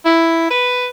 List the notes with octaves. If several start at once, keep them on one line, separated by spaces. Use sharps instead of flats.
E4
B4